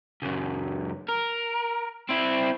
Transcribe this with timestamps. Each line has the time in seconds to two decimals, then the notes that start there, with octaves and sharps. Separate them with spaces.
0.22 C#2 F#2
1.08 A#4
2.09 C4 E4